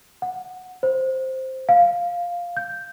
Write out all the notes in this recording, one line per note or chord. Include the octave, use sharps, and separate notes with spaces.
F#5
C5
F5
G6